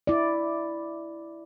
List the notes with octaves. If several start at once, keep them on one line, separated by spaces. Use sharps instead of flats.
E4 D5